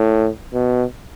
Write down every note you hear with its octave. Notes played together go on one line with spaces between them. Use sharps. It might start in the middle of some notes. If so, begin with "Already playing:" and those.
Already playing: A2
B2